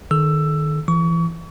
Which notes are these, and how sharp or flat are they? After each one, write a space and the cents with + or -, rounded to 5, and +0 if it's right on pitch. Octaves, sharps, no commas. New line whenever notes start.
D#3 -25 A4 -45 E6 +10
E3 +25 C#6 +35